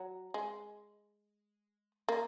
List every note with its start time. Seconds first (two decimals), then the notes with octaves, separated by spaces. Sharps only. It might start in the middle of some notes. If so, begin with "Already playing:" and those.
Already playing: F#3
0.34 G#3
2.09 A#3